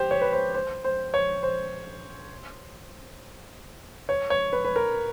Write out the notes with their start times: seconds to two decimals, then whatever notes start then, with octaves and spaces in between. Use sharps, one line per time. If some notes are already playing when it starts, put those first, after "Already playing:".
Already playing: G4 C5
0.11 C#5
0.21 B4
0.33 C5
0.54 C5
0.84 C5
1.14 C#5
1.43 C5
4.09 C#5
4.30 C#5
4.53 B4
4.65 B4
4.76 A#4